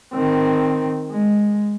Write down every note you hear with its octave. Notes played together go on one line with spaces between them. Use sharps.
D#3 C4
G#3